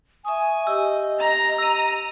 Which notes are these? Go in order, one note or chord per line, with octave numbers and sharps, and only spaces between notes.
E5 G#5 C#6 D#6
G4 D#5 E6
A#5
E6 D#7